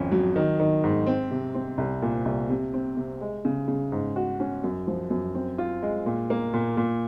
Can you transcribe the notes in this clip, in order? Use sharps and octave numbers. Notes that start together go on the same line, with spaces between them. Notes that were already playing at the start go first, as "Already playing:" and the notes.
Already playing: G#1 F2 C#4
F#3
D#3
D#3
G#2
C4
C3
C4
C2
A#2
C2
C3
C4
C3
G#3
C#3
C#3
G#2
F#4
C#4
F#2
F3
F#2
C4
F4
G#3
A#2
A#3
A#2
A#2